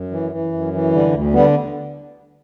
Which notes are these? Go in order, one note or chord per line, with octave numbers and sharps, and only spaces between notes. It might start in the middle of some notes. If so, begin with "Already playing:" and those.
Already playing: F#2
E3
E3
F#2
E3
D3 G3
D2
D3 G3 B3